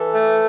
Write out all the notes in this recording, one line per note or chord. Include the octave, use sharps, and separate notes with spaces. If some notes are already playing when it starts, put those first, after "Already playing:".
Already playing: E3 A4
A3